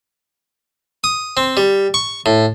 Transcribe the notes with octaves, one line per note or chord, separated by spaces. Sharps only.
D#6
C4
G3
C#6
A2